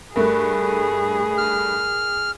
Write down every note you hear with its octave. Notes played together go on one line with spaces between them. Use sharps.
G2 A3 G#4 A#4
F6